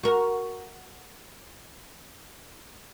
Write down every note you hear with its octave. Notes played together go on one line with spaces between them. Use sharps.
F#4 A#4